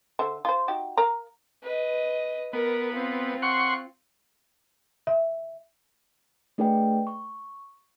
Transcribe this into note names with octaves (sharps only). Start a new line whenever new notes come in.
D3 C5 E5
F4 C5
D#4 F#4 G4
A#4 F5 A#5
B4 D#5
B3 A#4
C4 F4
F#5 C6 C#6
E5
A3 D4 G#4 B4 D5 G5
C#6